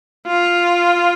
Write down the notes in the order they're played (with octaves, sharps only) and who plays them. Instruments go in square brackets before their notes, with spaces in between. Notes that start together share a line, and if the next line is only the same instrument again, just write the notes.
[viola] F4